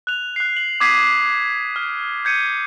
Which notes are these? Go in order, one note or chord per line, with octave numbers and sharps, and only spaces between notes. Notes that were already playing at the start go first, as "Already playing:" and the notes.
F#6 F7
F#6 C7
F#7
D6 D#6 G#6 B6 C7 D#7
F6
G6 G#6 C#7 D#7